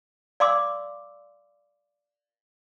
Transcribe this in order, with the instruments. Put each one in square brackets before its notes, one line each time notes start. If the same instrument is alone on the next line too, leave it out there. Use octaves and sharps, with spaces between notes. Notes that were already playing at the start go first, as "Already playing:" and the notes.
[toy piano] D5 F5 C6 D6 E6